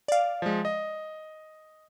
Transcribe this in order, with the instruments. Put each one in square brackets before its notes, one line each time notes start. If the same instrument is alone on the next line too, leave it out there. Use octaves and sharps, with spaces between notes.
[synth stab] D5 F5
[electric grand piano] F3 G#3
D#5